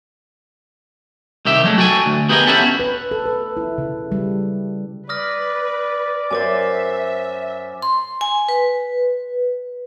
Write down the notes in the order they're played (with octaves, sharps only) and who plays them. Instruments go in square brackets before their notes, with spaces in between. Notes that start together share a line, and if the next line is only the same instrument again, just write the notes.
[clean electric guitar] C2 D#3 G4 E5
F#3 G#3 A3
F#4 A4 G5 G#5
D2
B3 G4 G#4 A#4 D#5
B3 C#4 E4 F#4 G4 A4
[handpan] B4
A4
B4
E4
C#3
G3
[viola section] B4 [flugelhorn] D5 [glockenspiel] D#6 F6 A#6
[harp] F#2 A#4 C5 [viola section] E5 [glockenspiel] G#5 D6 A6
[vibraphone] C6
G#5
B4